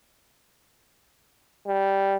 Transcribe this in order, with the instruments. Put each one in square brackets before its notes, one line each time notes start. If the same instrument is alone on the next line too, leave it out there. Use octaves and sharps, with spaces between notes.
[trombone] G3